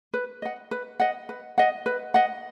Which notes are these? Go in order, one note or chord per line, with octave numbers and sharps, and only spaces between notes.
B4
D#5 F#5
B4
D#5 F#5
B4
D#5 F#5
B4
D#5 F#5